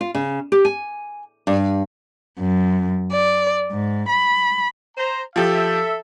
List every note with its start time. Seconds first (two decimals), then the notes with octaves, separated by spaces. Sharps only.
0.01 F4
0.15 C#3
0.52 G4
0.65 G#5
1.47 G2
2.40 F#2
3.11 D5
3.71 G#2
4.09 B5
4.97 C5 A#5
5.36 F3 G4 A4 E5